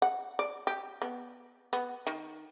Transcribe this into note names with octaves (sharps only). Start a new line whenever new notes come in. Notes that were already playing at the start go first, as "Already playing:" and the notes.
F#5
D5
G4
B3
B3
D#3